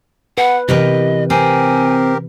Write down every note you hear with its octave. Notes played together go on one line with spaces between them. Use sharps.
B4 F#5
C3 E3 G4 A#4 B4 D#5
C4 G4 A#4 G#5